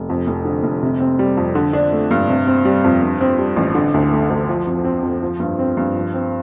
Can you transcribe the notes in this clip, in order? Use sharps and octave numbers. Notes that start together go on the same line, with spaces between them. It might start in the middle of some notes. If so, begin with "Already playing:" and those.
Already playing: F1
F2
F1
D3
F1
C3
C4
G3
F2
D3
D4
A3
G2
C3
C4
G3
F2
G2
C4
G3
A1
D3
D2
A3
D2
F3
F2
C4
F2
F3
G2
C4
G2
F3
C4